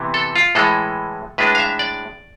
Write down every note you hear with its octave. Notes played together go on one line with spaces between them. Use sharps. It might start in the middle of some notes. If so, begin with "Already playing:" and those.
Already playing: C3 E3 B3
A4
F4
A2 E3 G#3 A4
A2 G#3 D4 B4
F5
E5
D5